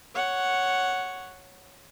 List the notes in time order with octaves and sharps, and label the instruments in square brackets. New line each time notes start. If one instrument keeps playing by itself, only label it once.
[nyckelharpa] C#5 F#5